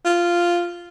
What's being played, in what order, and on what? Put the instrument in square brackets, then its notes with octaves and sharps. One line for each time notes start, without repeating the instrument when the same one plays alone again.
[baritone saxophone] F4